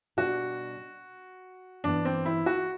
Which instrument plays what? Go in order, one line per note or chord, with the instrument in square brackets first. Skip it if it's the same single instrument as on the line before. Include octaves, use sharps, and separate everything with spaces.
[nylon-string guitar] B2 G3 D4 G4 D5 [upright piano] F#4
[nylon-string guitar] G2 E3 B3 [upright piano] D4
[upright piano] C4
E4
F#4